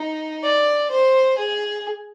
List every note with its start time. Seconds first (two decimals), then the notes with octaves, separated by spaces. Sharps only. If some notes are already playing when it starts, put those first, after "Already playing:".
Already playing: D#4
0.44 D5
0.90 C5
1.38 G#4